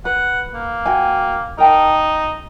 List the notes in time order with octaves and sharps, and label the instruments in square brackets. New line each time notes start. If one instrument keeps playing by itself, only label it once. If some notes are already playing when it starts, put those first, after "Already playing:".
[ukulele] B4 [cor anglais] F#5
[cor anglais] A#3
[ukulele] F#4 G5 G#5
[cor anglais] D#4 [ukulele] A#4 G5 A5